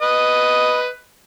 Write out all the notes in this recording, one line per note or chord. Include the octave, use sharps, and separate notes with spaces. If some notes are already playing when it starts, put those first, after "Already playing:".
B4 D#5